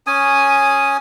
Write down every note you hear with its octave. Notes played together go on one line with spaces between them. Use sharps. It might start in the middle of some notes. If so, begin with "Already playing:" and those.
C#4 G#5 D#6